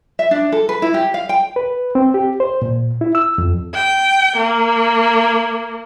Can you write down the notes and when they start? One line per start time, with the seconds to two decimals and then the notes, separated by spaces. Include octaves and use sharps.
0.19 E5
0.31 D4
0.52 A4
0.69 B4
0.82 E4
0.94 G4
1.14 F5
1.29 G5
1.56 B4
1.95 C4
2.14 G4
2.40 C5
2.62 A#2
3.01 E4
3.15 E6
3.38 F2
3.74 G5
4.37 A#3